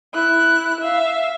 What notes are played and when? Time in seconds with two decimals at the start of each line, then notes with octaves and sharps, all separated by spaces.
0.14 E4 F#6
0.81 E5 F5